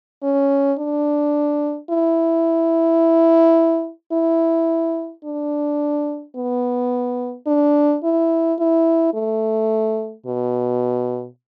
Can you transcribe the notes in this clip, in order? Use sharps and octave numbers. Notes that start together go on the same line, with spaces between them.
C#4
D4
E4
E4
D4
B3
D4
E4
E4
A3
B2